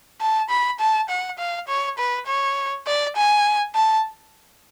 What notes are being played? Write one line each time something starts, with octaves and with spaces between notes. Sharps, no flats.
A5
B5
A5
F#5
F5
C#5
B4
C#5
D5
G#5
A5